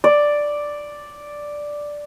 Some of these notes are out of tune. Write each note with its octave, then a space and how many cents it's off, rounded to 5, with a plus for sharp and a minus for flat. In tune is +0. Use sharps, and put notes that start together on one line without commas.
D5 +0